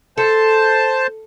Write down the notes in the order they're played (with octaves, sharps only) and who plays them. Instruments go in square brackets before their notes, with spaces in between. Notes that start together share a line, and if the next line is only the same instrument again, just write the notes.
[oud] A4 [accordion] C5 A5